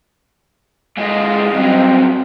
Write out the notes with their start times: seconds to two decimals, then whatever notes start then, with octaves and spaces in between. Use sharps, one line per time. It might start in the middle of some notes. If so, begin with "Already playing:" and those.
0.98 A#2 G#3 D#5 F5
1.53 G2 F#3 C4